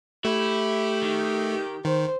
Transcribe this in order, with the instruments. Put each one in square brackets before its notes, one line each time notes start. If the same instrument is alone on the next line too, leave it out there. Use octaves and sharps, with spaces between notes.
[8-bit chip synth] A3 [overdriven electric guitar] E4 [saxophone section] G4
[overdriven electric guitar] D#3
[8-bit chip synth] D#3 [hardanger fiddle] C5